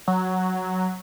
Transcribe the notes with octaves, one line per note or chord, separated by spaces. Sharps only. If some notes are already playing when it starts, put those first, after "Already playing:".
F#3